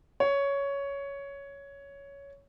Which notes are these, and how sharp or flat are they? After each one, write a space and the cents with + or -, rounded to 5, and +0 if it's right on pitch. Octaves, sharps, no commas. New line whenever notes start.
C#5 +10